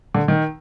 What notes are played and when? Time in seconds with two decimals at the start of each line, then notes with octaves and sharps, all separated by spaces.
0.15 D3
0.28 D#3